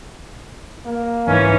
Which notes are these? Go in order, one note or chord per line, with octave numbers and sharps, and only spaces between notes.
A#3
C2 G#2 E3 C#4 D#4 C#5